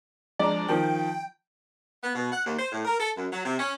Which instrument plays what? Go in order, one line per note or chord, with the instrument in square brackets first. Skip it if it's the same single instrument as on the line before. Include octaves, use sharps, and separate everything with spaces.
[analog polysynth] F3 G#3 D4 [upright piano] D5 A#5
[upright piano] D#3 F3 [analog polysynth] G5
[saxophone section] B3
B2
F#5
D#2
C5
A2
A#4
A4
F#2
F#3
C3
C#4